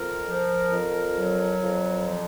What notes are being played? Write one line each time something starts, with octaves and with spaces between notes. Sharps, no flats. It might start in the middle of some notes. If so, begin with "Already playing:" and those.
Already playing: F2 A#4
F3
F2
F#3
F2
F3